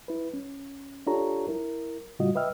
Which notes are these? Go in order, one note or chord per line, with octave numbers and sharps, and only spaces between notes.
E4 B4
C#4
D4 F4 G4 A4 C#5 A#5
E4 A#4
A2 C#3 G3 F4 F#4 D#5
B4 D#5 E5 G5 E6 F6